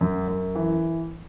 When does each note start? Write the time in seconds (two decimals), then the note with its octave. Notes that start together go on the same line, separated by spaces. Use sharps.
0.01 F#2
0.28 F#2
0.55 E3